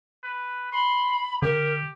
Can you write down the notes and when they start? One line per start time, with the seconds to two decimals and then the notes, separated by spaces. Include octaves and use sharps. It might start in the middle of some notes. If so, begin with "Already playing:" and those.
0.24 B4
0.72 B5 C6
1.42 D3 G4 A#4